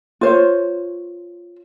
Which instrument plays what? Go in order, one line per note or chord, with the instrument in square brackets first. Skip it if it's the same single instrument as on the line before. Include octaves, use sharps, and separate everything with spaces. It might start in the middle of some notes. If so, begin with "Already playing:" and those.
[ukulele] F4 C5 C#5